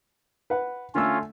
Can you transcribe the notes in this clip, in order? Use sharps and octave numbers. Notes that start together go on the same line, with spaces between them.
B4 F#5
D3 A3 C#4 F4 E6